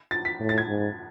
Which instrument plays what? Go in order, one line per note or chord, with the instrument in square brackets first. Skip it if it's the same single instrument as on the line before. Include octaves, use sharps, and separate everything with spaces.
[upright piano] A6
B6
[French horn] A2
[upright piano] A6
G#6
[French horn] G#2